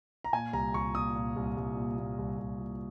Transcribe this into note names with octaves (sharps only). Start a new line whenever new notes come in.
A#5
A#2 G#5
C2 A#5
C2 C#6
A#2 D#6
A#2
C2
C2
A#2
A#2
C2
C2
A#2